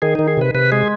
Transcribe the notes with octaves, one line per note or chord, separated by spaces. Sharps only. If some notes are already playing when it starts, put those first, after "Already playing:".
D#3 G#4
D#3 D#4
G#4
C3 B4
C3 B4
G#3 G#4